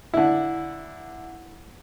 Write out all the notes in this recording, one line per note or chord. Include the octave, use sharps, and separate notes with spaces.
D3 E4